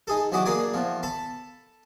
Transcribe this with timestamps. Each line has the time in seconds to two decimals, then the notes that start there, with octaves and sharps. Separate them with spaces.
0.07 D#4 G#4 A4
0.32 E2 F#3 F#4 D#5 B5 D6
0.46 A#3 D4 G#4 A#4 D5 G#5
0.74 E2 F3
1.03 A4 A5 B5